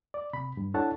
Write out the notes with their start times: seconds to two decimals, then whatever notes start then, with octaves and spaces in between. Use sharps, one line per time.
0.14 D5
0.33 C3 B5
0.57 G2
0.74 D4 E4 A4 C#5 F#5 A5